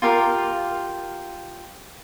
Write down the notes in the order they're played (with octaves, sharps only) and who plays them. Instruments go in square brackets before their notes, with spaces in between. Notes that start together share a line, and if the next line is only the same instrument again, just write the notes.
[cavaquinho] F4 G4 A#4 F5